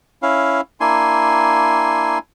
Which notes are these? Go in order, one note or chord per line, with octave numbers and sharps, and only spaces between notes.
C#4 E4 F5
A#3 D4 E4 G#5 C6